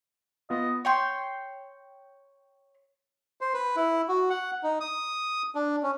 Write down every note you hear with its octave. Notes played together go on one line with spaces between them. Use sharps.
B3 F4 D#5
C#5 G5 C6
C5
B4
E4
F#4
F#5
D#4
D#6
D4
C#4